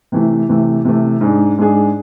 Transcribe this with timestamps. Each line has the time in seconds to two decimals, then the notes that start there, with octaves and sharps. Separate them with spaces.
0.12 C3 E3 A3
0.49 C3 E3 A3
0.85 C3 E3 A3
1.21 G#2 G#3 D4 G#4
1.58 G#2 G#3 D4 G#4